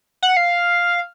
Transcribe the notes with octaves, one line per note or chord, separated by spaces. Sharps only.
F#5
F5